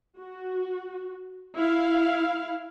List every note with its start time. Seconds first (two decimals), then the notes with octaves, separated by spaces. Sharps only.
0.19 F#4
1.56 E4 F5